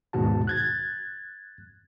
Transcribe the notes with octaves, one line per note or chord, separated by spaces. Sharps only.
D#2 G#2 B2 F#4 A5
F#6 G#6 A6